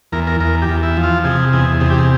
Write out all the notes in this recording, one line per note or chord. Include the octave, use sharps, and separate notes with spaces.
E2 A#4
A#4
E2 A#4
G4
E2
E4
F3
F4
C3 G#4
E2 G#4
C3 G#4
G4
G#4